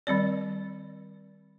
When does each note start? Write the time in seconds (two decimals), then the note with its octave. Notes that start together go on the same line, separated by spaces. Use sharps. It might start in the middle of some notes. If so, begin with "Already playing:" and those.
0.07 D#3 G3 C4 D5